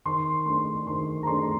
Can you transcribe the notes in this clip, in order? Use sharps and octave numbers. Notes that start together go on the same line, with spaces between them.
D#3 C6
A3 D4 C6
D#3 C6
A#5
A3 D4 C6